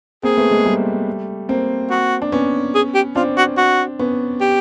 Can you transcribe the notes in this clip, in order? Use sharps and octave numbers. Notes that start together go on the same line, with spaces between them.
A#3 C4 G#4
A3 B3
G#3 A#3
G3 A3
A#3 C4
F#4
D4
B3 C#4
G#4
G4
C4 D4 F4
F#4
F#4
B3 C#4
G4